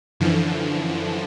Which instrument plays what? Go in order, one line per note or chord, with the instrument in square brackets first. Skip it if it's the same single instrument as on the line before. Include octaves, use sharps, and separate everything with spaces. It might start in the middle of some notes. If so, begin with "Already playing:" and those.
[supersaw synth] F#2 D3 E3 F3